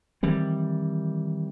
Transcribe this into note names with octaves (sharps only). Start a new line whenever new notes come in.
D#3 E3 G3 C4